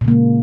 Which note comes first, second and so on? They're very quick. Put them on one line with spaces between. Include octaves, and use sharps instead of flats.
A#2 C#3 A#3 G#3